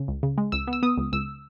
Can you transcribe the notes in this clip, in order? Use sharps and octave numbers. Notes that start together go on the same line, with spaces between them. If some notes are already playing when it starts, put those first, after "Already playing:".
Already playing: C#3
C#2
C#3
G#3
C#2 E6
B3
E6
B3 D#6
C#2
C#2 E6